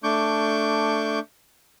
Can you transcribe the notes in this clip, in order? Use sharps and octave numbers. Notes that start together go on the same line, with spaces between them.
A3 D4 C#6 D6 G6